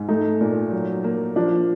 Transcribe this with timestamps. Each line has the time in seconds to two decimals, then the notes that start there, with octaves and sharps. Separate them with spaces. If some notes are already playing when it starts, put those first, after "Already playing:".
Already playing: G#2
0.09 A3 D#4
0.41 A#2
0.72 F#3
1.04 A#3
1.36 F3 D4